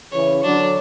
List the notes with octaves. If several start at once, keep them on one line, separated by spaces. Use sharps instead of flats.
C#3 E3 C#5
D3 F#3 D4